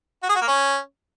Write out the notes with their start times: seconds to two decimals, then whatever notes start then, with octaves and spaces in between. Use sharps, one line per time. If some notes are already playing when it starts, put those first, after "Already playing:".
0.23 F#4
0.29 G#4
0.35 F#4
0.42 A#3
0.48 C#4